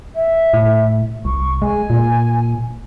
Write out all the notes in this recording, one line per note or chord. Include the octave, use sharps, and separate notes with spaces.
E5
A2
C2 C#6
G#3 G#5
A#2